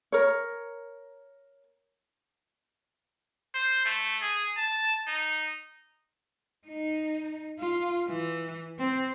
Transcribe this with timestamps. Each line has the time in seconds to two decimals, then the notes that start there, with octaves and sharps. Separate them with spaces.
0.12 A#4 C#5
3.54 C5
3.85 A3
4.22 G#4
4.57 A5
5.07 D#4
6.68 D#4
7.60 F4
8.08 E3
8.79 C4